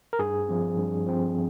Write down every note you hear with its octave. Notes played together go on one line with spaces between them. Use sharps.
A#4
G2 G#4
F3 C4
G2
F3 C4